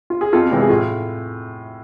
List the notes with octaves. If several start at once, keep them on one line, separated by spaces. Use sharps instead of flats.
F4
G#4
F2 F4 A4
C3 E3 G#3 C4
G#4
A2 F4